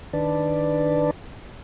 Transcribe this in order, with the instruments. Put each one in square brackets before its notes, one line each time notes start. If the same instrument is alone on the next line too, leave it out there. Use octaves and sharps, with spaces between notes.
[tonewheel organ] D#3 D4 B4 D5 A5